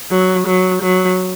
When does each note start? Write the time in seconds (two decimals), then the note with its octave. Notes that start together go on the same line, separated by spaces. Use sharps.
0.11 F#3
0.47 F#3
0.82 F#3